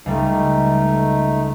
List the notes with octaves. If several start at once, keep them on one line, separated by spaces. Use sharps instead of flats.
C#2 G3 A3 D#4